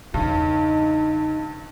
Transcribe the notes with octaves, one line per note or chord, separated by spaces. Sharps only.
E2 G2 C#3 D#4